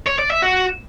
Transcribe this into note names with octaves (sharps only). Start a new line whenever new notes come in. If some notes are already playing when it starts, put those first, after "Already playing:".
C#5
D5
E5
F#4